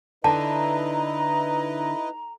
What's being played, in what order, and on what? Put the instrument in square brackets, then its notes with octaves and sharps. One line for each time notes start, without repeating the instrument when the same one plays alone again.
[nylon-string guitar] D3 [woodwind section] D#4 A#5 [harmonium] E4 B4 D#5 [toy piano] A5